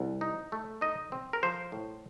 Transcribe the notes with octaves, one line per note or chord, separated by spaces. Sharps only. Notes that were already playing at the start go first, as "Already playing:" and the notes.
Already playing: C2
D#4
A3
D#4 D#5
C4
A#4
F3 C5
A2